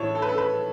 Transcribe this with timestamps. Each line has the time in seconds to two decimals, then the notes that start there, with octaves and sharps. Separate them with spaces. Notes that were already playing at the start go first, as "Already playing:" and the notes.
Already playing: A1 A2 E3 C#5 A5
0.15 A4
0.22 B4
0.29 A4
0.38 B4